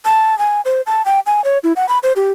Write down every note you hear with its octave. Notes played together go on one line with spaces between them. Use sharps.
A5
G#5
C5
A5
G5
G#5
C#5
E4
F#5
B5
C5
G4